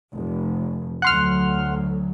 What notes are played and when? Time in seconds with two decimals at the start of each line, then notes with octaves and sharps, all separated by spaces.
0.14 F1
1.02 D2 F#3 F#5 C6 F6